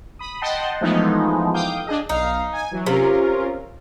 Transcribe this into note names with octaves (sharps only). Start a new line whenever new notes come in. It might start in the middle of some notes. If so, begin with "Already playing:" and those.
B5 D#6
D#5 F#5 G5 A5 C6
E3 F3 G#3 A3 B3 D#4
F5 G5 D6 D#6 G6
D4 G#4 D#5
B1 D#4 F5
G#5
E3 F#3
C3 C#4 F4 A#4